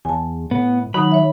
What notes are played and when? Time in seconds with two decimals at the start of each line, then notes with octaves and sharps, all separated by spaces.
0.05 E2 G#5 A5
0.51 A2 B3
0.94 D#3 F#3 D#4 B5 D#6
1.11 C#5 E5